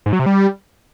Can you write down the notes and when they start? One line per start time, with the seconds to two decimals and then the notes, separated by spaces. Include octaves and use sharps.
0.06 G#2
0.13 F#3
0.19 C3
0.26 G3